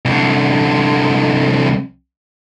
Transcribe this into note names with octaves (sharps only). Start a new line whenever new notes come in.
C2 D3